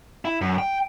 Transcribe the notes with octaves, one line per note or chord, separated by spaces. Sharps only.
E4
F#2
G5